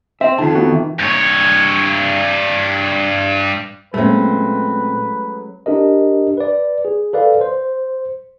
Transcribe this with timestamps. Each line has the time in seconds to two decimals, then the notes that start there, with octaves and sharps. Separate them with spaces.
0.21 C4 E5
0.38 F2 D#3 A5
0.55 B3 F#4
0.72 E3
1.00 G2 C#5
3.94 A#2 F#3 G#3 A3 C4 C#4 B4
5.66 D4 G4 A#4 D#5
6.37 B4 D5
6.85 G#4
7.13 A4 B4 D5 F5
7.41 C5